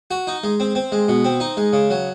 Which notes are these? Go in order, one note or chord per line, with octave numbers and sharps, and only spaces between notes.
F#4
D#4
G#3
C4
C4
G#3
B2
C4
D#4
G#3
C#3
F#3